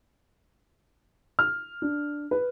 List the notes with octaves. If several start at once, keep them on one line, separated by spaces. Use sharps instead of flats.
F6
D4
B4